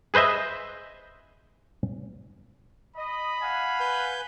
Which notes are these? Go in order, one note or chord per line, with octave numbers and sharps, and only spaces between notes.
G#4 B4 C5 D#5 E5
D#5 B5
F5 F#5 G#5
B4 G6